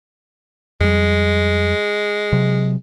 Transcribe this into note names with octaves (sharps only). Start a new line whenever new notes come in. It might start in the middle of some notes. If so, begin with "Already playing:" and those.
F2 G3 G#3
C3 F#3